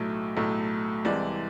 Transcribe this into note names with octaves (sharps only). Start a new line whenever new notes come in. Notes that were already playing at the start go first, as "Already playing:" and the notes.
Already playing: B1 A2 F#3 A3
B1 A2 F#3 A3
C2 C3 E3 G#3 D5